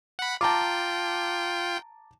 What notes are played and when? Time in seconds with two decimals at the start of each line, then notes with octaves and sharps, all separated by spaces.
0.19 F#5 B5
0.41 F4 G5 A5 A#5 D6